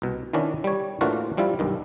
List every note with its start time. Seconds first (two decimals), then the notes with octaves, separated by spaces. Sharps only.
0.02 C2 B2
0.33 D#3 E3 B3 C#4 D4 E4
0.64 G3 C#5
1.01 A2 E3 A#3 D4 F4 F#4
1.37 F3 G3 E4 F4
1.59 B1 G2 D#3